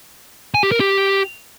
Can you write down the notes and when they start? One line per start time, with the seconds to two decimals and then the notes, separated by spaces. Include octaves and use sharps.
0.54 G#5
0.63 G4
0.72 A#4
0.80 G4